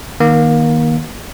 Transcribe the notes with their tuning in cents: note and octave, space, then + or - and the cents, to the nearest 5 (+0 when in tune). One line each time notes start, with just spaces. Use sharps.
D#3 +0 A#3 +25